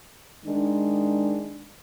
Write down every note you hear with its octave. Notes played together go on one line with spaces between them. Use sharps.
D#3 G#3 D4